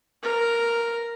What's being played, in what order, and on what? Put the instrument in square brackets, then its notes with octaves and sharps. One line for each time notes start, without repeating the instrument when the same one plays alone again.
[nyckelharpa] A#4